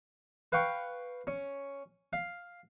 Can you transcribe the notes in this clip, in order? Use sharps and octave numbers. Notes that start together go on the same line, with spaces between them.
B4 F5 G5 C#6
C#4
F5